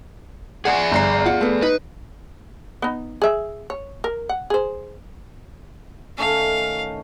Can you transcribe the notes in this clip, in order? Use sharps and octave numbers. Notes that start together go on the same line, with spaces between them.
G#4 D5 F#5 G#5 C7
G1 A#5 C7
F4 F#5
A3 B3
D#4 B4
B3 D#4
G#4 E5
C#5
A#4
F#5
G#4 C5
D#3 A3 C#4 F5